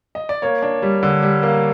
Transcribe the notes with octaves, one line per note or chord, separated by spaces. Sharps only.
D#5
D5
A#3 C#5
D4
G3
D3
G3
A#3